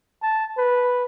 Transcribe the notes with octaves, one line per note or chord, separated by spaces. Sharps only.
A5
B4